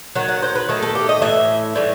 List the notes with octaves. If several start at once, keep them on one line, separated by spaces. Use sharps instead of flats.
D#3 F#3
F#5
C5
B4
D#3 F#3 A3 A4
A4
G4
D#5
A2 E3 E5
A2 E3 G3